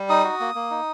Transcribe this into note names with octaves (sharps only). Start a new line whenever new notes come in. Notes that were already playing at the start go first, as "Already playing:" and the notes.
Already playing: G3
D#4 D#6
F#4
A#3
A#3
D#4